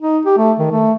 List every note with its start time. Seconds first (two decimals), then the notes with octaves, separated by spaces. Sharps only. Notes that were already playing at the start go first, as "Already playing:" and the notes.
0.01 D#4
0.26 G4
0.37 A3
0.59 D#3
0.72 A3